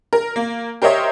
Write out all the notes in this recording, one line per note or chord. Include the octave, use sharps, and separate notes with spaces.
A#4
A#3
G4 A#4 C5 C#5 D#5 E5